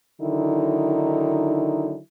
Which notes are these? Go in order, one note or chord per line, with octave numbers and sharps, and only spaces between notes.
D3 D#3 F#3 D#4 E4